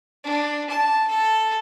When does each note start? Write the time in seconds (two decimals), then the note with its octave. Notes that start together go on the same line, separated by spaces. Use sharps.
0.24 D4
0.69 A5
1.08 A4